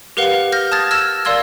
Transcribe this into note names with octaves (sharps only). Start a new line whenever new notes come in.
G4 A#4 B4 F5 F#5
F6 G6 A#6
A5 D#6 F6 G#6 A6
E6 F6 G#6 A#6 E7
A#4 D5 F5 C6 E6 G#6